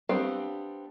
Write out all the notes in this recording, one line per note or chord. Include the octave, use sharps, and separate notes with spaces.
G3 B3 C4 D4 F5